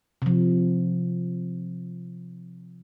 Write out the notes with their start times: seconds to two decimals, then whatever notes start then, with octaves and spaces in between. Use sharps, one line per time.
0.22 C3 F3